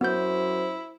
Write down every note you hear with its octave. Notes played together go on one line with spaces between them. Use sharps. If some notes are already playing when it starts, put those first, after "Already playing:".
F#2 B3 E4 C5 G6